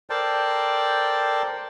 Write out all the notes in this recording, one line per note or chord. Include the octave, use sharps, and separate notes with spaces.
A4 A#4 C5 D5 G5 A5